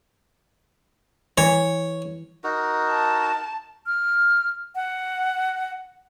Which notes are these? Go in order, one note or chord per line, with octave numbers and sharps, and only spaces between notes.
E3 C#5
D#4 F#4 A#4
A5
F6
F#5